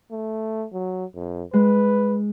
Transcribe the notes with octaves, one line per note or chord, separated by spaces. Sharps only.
A3
F#3
F2
G#3 B4